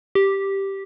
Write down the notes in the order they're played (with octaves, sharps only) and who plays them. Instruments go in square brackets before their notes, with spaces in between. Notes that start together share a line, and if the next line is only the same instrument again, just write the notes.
[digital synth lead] G4